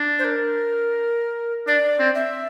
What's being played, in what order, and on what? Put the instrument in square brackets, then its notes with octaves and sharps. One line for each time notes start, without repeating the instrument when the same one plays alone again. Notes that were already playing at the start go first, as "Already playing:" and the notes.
Already playing: [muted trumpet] D4
[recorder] C5
A#4
[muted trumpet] D4 [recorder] D5
[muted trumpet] C4
[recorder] E5